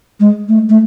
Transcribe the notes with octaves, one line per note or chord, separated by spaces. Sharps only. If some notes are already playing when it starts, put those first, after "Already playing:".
G#3
A3
A3